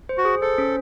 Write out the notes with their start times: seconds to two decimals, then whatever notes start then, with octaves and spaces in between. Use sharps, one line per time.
0.09 C5
0.18 F#4
0.25 G#4
0.41 A4 C5
0.58 C#4